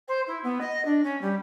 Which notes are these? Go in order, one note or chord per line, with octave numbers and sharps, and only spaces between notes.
C5
E4
B3
D#5
D4
C#4
G3